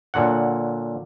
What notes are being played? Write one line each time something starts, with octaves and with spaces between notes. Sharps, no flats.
A#2 D3 F#3 F#5